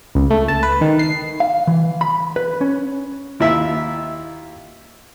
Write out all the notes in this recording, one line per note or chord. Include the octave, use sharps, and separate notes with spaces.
C#2
A3
A5
B4
D#3
C7
F5
E3
B5
B4
C#4
D#2 E4 F4 E5